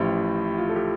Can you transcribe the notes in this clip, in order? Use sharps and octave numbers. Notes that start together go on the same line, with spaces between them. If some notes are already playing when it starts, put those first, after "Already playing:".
Already playing: A1 A2 F3 G4
F4
A4
G4